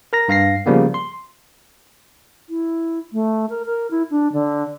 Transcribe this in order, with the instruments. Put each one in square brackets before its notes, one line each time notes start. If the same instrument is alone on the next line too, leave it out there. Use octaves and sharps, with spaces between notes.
[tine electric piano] A#4 A#5 A#6
G2 F5 A#6 C7
C#3 F3 G3 A#3 B3
C6
[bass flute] E4
A3
A#4
A#4
E4
D4
D3